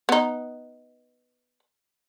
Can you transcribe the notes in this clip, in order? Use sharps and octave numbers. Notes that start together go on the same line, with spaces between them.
B3 D#4